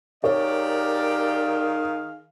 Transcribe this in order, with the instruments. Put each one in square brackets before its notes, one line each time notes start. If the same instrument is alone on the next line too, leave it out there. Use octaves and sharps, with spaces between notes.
[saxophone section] D#3 G#4 F5 [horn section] G4 A#4 D5 [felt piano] C#5